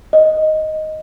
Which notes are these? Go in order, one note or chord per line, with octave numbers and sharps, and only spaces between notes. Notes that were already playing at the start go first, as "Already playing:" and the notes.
D#5